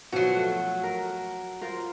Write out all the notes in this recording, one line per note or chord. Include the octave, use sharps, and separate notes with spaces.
B2 F3 F#3 F#4
A3
A#4
F4 A#4 C5